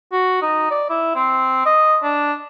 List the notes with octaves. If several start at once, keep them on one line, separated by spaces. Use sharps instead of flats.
F#4
D#4
D5
E4
C4
D#5
D4